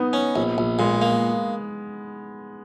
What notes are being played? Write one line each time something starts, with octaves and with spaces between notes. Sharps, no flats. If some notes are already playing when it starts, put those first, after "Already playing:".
Already playing: B3 D#4
C#4
A#1
A#1
A#2 G#3
A#3